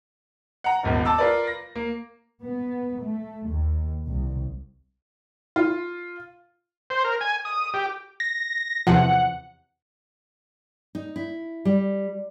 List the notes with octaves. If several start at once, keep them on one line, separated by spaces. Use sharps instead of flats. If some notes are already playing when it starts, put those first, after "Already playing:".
F#5 A#5
D#1 G#1 E2
A5 D6 E6
F4 A#4 B4 D5
A#6
A#3
B3
A3
D#2
C2
F4
C5
A#4
G#5
D#6
G4
A#6
E2 C3 F3 F#5
D#4
E4
G3